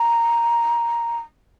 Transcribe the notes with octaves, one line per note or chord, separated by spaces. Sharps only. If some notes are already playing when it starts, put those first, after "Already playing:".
Already playing: A#5